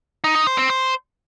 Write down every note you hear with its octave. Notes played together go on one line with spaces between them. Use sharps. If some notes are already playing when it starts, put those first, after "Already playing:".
D#4
D#4
C5
C4
C5